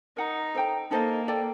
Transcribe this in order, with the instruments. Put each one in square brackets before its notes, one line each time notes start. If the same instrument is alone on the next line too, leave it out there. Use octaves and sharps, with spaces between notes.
[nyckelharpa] D#4 [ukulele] A#4 F#5 A#5
[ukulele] A4 C5 G5 A#5
[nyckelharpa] A#3 [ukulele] D#4 A4 C5 D#5
[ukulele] A4 D5 G5